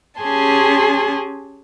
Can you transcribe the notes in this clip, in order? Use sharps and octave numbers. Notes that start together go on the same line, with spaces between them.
C#4 G4 G#4 G#5 A5 C6